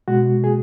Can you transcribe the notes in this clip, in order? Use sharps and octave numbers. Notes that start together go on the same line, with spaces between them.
B2 G#3 F#4
G#4